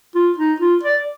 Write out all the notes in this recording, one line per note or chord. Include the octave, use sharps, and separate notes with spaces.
F4
D#4
F4
D5